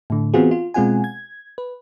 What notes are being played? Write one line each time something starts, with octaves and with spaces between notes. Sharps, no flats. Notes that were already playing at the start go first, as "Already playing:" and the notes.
A2 D3
E3 B3 C4 F4 F#4 G#4
F4
B2 G#3 C4 F4 F#5 G#5
G#6
B4